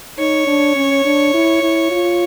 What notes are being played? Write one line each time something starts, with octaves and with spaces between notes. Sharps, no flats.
D#4 C#5
D4
C#4
D4
E4
E4
F4